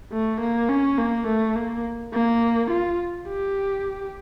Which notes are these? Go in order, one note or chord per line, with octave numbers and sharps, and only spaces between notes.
A3
A#3
C#4
A#3
A3
A#3
A#3
F4
G4